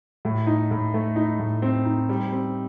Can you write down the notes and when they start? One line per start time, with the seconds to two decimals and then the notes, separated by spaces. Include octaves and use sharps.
0.25 A2
0.47 D#4
0.71 A2
0.94 A3
1.16 D#4
1.39 A2
1.62 C4
1.85 D#4
2.09 G3
2.32 C4